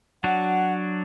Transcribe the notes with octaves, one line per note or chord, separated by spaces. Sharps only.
F#3 D4 F#4 F#5